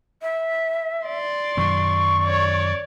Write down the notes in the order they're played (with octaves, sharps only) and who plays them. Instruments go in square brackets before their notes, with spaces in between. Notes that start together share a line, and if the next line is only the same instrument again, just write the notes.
[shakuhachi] E5
[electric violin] D5 C6
[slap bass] F#2 D#3 F#3 [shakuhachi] C#6
[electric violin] C#5 D5